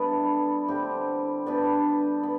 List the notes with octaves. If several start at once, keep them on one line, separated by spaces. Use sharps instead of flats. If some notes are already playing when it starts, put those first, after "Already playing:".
Already playing: G3 B3 D4 E4 A4
D3 G3 C4 G4
B3 D4 G4 B4
B3